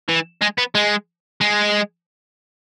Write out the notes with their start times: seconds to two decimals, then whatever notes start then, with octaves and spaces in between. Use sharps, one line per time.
0.09 E3
0.42 G#3
0.58 B3
0.75 G#3
1.41 G#3